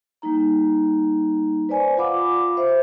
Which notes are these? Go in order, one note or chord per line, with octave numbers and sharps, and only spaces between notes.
G3 A#3 D#4 A#5
B4 C5 D5 G#5
F4 F5 F#5 B5 D6
C5 E5